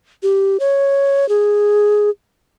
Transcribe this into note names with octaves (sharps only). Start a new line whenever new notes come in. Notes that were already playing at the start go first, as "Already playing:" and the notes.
G4
C#5
G#4